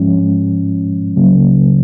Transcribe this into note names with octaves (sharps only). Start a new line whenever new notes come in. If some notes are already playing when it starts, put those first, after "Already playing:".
Already playing: G#2 F3 G#3 C#4
C#2 C#3 F#3 A#3